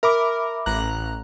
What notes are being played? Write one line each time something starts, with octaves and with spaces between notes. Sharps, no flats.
A#4 E5 B5 D6
A1 A#5 F#6